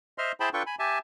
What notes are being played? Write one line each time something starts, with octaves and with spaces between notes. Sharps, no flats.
C5 D#5 E5 C6 F6
E4 G#4 C5 G5 A5 B5
D4 F4 A4 B4 G5 C#6
G#5 B5
G4 E5 G#5 A5